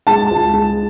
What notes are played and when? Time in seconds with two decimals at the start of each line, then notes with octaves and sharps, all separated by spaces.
0.07 G#3 A5
0.31 C#2
0.54 G#3